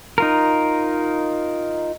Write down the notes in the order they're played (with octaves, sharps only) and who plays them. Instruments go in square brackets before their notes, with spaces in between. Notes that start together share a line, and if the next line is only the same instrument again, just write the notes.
[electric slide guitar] D#4 F4 A#4